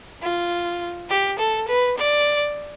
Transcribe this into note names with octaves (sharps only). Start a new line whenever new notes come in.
F4
G4
A4
B4
D5